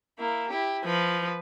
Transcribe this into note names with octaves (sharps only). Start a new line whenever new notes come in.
A#3 E4
E4 G4
F3 B4